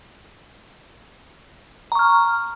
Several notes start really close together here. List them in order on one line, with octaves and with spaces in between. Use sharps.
A#5 C#6 F6